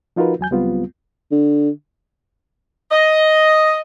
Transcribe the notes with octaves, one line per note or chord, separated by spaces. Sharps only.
F3 D#4 F4 F#4 A#4 B4
E2 F#3 G#5 G6
C#2 F#3 G3 B3 C4 F4
D3
D#5